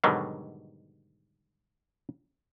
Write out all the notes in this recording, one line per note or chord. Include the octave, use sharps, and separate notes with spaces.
G#2 B2 D3 D#3 F#3 G3